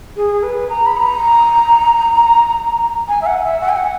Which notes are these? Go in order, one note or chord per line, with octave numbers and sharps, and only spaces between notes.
G#4
B4
A#5
B5
A#5
G#5
E5
F#5
E5
F#5
G#5
F#5